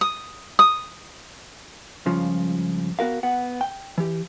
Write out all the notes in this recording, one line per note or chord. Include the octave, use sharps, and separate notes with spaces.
D#6
D#6
C#2 G2 C#3 F3 F4
B3 F#4 A#4 F5
B3 F#5
G5
E3 G4